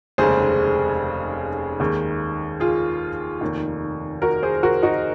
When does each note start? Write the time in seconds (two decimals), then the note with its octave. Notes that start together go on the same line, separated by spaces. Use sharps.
0.18 F1 D#2 C#3 G#3 G#4 C5
1.80 D#2 D#3 G#3
2.60 F4 G#4
3.41 F1 D#2 D#3
4.22 F#4 A#4
4.43 G#4 C5
4.63 F#4 A#4
4.83 D#4 F#4